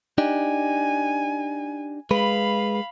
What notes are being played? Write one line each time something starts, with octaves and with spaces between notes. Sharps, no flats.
D4 D#4 G4 G#5
G#3 B4 F5 B5